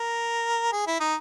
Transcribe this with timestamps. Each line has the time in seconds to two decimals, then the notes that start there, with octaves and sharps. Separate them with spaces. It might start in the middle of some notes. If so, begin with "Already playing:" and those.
Already playing: A#4
0.72 G#4
0.87 E4
1.00 D#4